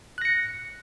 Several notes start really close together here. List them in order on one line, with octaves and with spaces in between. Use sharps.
F#6 A#6 C#7